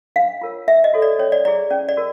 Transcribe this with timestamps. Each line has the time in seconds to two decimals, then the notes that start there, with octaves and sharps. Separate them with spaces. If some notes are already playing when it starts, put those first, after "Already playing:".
0.16 D4 F5
0.41 F4 A#4 C#5
0.67 D4 E5
0.84 D#5
0.94 F#4 A4 C#5
1.02 D5
1.19 C#4 C#5
1.32 D5
1.45 E4 G#4 D5
1.71 C#4 D5
1.89 D5
1.97 F#4 A#4